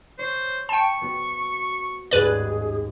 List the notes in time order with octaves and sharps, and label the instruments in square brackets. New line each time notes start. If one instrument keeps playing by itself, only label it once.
[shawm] C5 [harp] C#5
[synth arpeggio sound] G5 A5 [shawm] C#6 [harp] G6
[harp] B3 F#4 C5
[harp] A1 D#2 G#2 [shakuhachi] G#4 [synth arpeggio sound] B4 D5